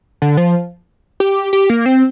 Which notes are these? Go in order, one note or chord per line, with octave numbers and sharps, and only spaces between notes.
D3
F3
G4
G4
A#3
C4